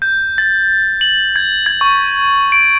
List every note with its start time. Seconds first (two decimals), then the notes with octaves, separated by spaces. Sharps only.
0.02 G6
0.38 A6
1.01 F#7
1.36 G#6
1.66 G#6
1.81 C#6
2.52 D7